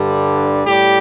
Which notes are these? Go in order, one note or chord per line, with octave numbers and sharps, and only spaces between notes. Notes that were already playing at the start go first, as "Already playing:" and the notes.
Already playing: G2 D3 G3
A2 G3 G4